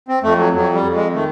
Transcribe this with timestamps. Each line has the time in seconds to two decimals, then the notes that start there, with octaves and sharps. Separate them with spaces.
0.08 C4
0.23 F2 A3
0.38 F#3
0.53 F2 F#3
0.74 G3
0.84 F2
0.94 G#3
1.13 D#3 A3